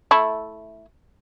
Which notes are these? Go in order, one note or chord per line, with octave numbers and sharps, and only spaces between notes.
A3 E4